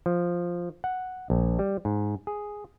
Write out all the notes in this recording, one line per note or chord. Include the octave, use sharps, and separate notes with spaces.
F3
F#5
A#1
G3
G#2
G#4